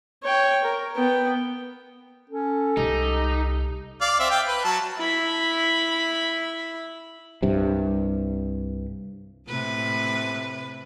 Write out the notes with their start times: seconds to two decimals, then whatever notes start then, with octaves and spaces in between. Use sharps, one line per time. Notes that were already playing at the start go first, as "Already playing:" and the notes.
0.23 C#5 G5
0.64 A#4
0.96 B3 G5
2.30 C#4 A4
2.77 C2 D#4 G4
4.01 D5 F5
4.19 C4 E5
4.31 F5 G5
4.47 B4
4.64 F#3 A5
4.98 E4 B5
7.42 C2 G2 C3
9.48 A2 C3 B4